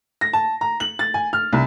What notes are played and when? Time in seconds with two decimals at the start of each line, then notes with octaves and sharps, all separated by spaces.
0.21 A#6
0.33 A5
0.61 A#5
0.80 F#7
0.99 A6
1.14 G#5
1.33 F6
1.53 C2